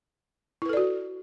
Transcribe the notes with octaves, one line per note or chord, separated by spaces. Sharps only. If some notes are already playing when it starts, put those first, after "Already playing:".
E4 F#4 A4 B4 D5